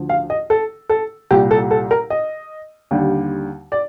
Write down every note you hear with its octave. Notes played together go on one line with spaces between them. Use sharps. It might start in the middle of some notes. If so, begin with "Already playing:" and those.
Already playing: D2 D3 F3
F5
D#5
A4
A4
C2 A#2 G3 G4
A4
A4
A#4
D#5
D#2 D3 G3
D5